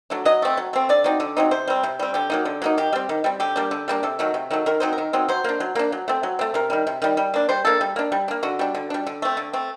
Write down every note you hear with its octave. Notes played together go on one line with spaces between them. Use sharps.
F#3 A3 D4
F#3 D#5
A3 C4
F#3
A3 C4
D3 D5
F#3 C4 D#4
D3
F#3 C4 D#4
C3 C5
G3 C4
C3
G3 C4
D3 G4
F#3 A#3 D#4
D3
F#3 A#3 D#4
D#3 G4
G3 C4
D#3
G3 C4
D3 G4
G3 A#3 D4
D3
G3 A#3 D4
C3 A4
D#3 F#3 A3
C3
D#3 F#3 A3
D#3 A#4
F#3 C4 D#4 C5
A#4
D#3
F#3 C4 D#4
F#3 C5
A#3 D4
F#3
A#3 D4
F#3
A3 C4
F#3
A3 C4
C3 A#4
D#3 G3
C3
D#3 G3
G3
A#3 D4
G3 C5
A#3 D4 A4
G3
A#3 D4
G3
A#3 D4
D3 F#4
G3 D4
D3
G3 D4
D3
A3 C4
D3
A3 C4